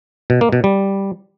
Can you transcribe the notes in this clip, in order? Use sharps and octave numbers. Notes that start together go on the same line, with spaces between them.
B2
A#3
B2
G3